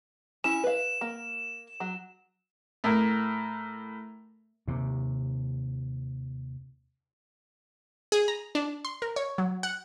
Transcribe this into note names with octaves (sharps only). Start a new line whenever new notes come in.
C#4 E4 E7
B4 F5
A#3
F#3
A2 A#4
D#2 C3
G#4
A#5
D4
C6
A#4
C#5
F#3
F#5